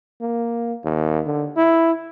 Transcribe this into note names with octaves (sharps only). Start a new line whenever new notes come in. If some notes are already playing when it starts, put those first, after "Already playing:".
A#3
D#2
D3
E4